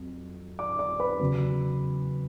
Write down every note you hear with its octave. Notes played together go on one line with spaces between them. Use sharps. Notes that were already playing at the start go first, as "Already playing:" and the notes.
Already playing: F2 F#3
D5 D6
D5 D6
B4 B5
E2 C#3 F#3